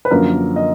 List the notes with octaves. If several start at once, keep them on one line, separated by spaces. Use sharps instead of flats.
B4
F#2 D3 F3 A#3 A#4
D#5